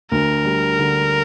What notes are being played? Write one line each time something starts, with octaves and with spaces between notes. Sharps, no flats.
D2 A#4
G3
D3